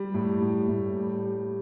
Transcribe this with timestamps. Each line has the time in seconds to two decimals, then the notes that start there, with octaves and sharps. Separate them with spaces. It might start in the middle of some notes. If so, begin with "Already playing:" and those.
Already playing: G3
0.14 A2
0.41 A2
0.68 A2
0.96 G3
1.24 G3